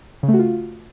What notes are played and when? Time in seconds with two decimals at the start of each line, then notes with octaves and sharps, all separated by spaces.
0.23 C#3
0.28 A3
0.34 F#4
0.39 F4